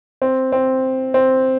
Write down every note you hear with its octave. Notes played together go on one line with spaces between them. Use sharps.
C4
C4
C4